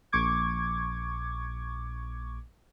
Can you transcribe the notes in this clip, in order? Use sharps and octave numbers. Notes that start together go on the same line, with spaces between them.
A#1 C#6 D6 G#6